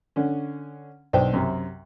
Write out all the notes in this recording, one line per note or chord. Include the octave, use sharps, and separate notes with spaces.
D3 C#4
B1 D4 C5 G5
F#2 C3